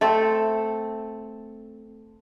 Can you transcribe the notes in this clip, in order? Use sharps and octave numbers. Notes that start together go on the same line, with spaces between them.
A3 C4 A4